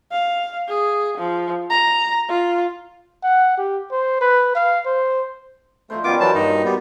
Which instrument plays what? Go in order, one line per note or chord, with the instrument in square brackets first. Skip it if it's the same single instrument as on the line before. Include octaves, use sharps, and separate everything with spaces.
[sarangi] F5
G#4
F3
A#5
F4
[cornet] F#5
G4
C5
B4
F5
C5
[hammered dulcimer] F3 D#4 C5 [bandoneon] A3
[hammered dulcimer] D#3 G3 C#4 [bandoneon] B3 F4 D6
[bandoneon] E3 F#3 A5 [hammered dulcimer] F#4 B4 C5
[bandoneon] G2 D#4 [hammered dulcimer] A#2 E3
[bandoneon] G3 B3